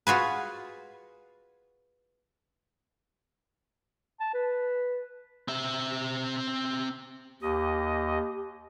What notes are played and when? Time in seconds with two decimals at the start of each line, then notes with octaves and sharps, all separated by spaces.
0.07 F4 F#4 G#4 B4
4.20 A5
4.34 B4
5.48 C4 E5
7.42 D#2 G4 D#5